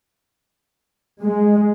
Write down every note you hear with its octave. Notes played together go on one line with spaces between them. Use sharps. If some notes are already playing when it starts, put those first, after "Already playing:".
G#3